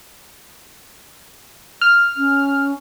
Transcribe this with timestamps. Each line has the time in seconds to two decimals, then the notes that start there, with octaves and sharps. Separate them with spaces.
1.81 F6
2.17 C#4